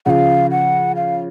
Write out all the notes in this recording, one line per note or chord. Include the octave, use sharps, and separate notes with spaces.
C#3 F3 F5 F#5
F#5
F5